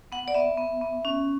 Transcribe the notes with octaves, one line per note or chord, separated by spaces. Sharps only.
B3 F#5
D5
B3 E5
B3
B3
C#4